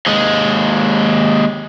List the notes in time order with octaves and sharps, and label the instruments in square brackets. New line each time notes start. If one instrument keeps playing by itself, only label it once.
[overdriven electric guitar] D#2 G#3